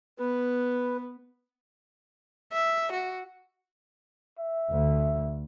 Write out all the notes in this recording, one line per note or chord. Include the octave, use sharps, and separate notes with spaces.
B3 B4
E5
F#4
E5
D2